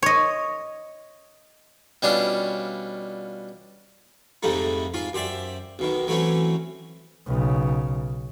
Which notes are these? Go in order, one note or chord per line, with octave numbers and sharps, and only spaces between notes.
C#5 D#5
B2 G3 C#4 D4 F4 A5
F2 G#2 C3 G3 A3 D#4
G#2 F4
F#2 G4 C5 D5 E5
B1 B2 D#3
E3 F#3 A3 C4 C#4
B1 C#3